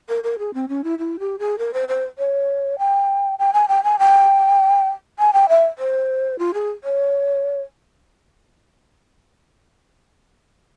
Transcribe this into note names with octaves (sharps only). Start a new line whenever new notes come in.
A#4
A#4
G#4
C4
C#4
E4
E4
G4
G#4
A#4
C5
C5
C#5
G5
G5
G#5
G5
G#5
G5
G#5
G5
E5
C5
F4
G#4
C#5